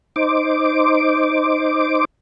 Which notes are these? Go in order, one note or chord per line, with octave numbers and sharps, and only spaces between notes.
D#4 C5 D6